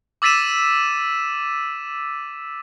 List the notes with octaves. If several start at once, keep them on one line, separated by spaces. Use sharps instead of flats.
D6 E6 A6 B6 D#7 E7